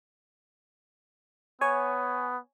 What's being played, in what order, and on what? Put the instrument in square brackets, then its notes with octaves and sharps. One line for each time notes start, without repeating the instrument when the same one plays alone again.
[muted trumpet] B3 [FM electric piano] C#5 G#5